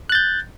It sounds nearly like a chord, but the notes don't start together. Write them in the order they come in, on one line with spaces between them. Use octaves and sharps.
F#6 A6 G6